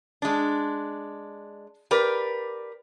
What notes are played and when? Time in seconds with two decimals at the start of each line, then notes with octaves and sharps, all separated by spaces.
0.22 G#3 D4
1.91 G4 A#4 B4 D5